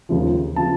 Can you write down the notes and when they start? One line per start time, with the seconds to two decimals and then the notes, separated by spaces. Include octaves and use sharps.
0.09 D#2 C#3 F3
0.56 C#3 F3 A5